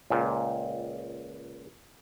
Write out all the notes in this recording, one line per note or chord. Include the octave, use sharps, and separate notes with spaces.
C#2 A#2